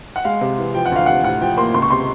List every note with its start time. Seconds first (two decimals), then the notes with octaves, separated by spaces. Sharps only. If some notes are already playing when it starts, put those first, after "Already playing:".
0.16 F#5
0.25 G#3 F5
0.41 C3
0.58 E3
0.75 F3 G5
0.86 F#5
0.92 D2 F5
1.06 C3 F#5
1.24 A2 F#5
1.41 F3 G5
1.57 A#3 C6
1.74 C#2 C6
1.82 C#6
1.90 C3 C6